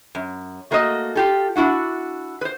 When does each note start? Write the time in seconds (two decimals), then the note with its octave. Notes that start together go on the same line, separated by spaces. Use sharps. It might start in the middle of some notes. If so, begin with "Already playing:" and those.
0.15 F#2
0.71 A3 A#3 F#4 C#5 D#5
1.15 F4 G4 A4
1.56 D4 E4 F#4 F#5
2.41 B4 C5